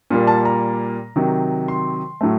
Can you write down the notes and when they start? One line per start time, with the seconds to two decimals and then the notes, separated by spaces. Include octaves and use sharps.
0.11 A#2 G3 A#3
0.27 A5
0.45 A#5
1.16 C3 D#3 F#3
1.68 C6
2.21 A2 F#3 A3